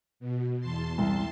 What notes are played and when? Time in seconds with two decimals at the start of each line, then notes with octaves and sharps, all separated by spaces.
0.20 B2
0.60 E2 A5 C6
0.98 C2